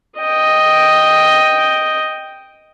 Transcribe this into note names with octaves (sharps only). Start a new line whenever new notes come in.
D#5 G5